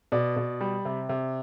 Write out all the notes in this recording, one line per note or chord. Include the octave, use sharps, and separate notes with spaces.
B2 D5
B2
G3
C3
C3